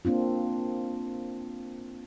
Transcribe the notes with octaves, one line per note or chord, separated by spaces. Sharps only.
A#3 C4 D4 F4